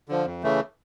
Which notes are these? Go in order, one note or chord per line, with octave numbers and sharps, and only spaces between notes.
D3 F3
F2
C#3 E3 A3